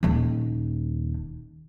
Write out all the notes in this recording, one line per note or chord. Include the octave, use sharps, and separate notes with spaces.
D#1 D#2